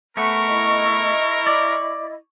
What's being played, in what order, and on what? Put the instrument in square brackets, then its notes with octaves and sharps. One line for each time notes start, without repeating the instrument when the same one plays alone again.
[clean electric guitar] A3 B3 [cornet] A#4 [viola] C#6
[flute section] E4 D#5
[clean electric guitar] D5